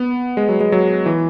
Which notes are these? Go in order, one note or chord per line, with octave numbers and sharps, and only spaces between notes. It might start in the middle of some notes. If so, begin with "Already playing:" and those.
Already playing: B3
G#3
F#3
G#3
F#3
E3